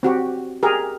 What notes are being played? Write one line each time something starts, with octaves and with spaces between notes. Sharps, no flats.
C4 F#4 G4
G4 G#4 A#4